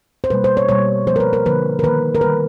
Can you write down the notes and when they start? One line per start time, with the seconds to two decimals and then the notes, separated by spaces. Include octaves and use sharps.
0.24 C5
0.30 B2 G3 A#3 B4
0.44 C5
0.57 C#5
0.69 B2 G3 A#3 C#5
1.07 D3 F3 A#3 C5
1.16 A#4
1.20 B4
1.33 A#4
1.45 D3 F3 A#3 B4
1.79 A#4
1.83 D#3 G3 A#3 B4
2.15 A#4
2.21 D#3 G3 A#3 B4